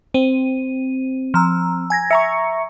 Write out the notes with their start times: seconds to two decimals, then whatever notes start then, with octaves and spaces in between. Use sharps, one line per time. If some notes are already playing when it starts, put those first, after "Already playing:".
0.14 C4 D#7
1.34 F3 A#5 E6
1.90 G#5 G#6 A#6
2.11 E5 A#5 C#6 C#7